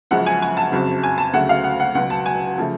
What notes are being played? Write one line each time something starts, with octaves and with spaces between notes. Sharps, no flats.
F#1 F#2 C#3 F3 G#3 F#5
G#5
G#5
A5
F#1 F2 C#3 F#3
G#5
A5
D2 C#3 F#3 A3 F#5
F5
F#5
F#5
C#2 B2 F#3 F#5
A5
G#5
C#3 F3 A3